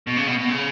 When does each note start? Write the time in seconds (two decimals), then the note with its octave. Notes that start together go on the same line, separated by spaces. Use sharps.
0.07 B2
0.17 C#3
0.28 B2
0.39 B2
0.49 C#3